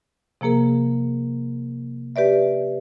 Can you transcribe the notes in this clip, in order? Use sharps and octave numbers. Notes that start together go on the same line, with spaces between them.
C3 F3 A#3 G#4 A#4
G4 B4 D5 E5